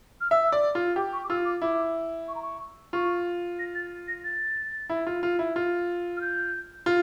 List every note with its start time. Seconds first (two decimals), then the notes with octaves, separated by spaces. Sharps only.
0.21 F6
0.31 E5 E6
0.52 D5
0.75 F4
0.96 G4 D6
1.13 C#6
1.24 D6
1.29 F4 E6
1.45 D6
1.62 E4 D6
2.28 C#6
2.35 A#5
2.42 C#6
2.93 F4 C#6
3.59 A#6
3.75 A6
4.08 A#6
4.24 A6
4.90 E4
5.07 F4
5.23 F4
5.39 E4
5.56 F4
6.16 F6
6.21 G6
6.86 F4